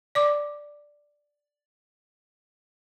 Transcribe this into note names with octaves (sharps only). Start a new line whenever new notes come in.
D5 D6